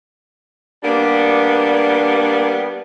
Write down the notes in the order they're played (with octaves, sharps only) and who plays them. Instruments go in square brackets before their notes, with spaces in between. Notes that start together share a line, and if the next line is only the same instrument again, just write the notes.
[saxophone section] G3 A#3 B3 D4